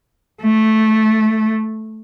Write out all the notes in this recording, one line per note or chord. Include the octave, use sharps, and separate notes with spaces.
A3